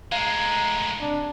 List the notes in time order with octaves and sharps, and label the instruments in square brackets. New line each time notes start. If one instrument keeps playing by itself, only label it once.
[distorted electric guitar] A2 G#3 [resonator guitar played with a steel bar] F5 [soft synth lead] A#5
[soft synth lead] C3 [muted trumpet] D4